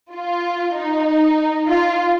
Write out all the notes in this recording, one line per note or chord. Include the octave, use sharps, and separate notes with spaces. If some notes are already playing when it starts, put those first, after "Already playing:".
F4
D#4
F4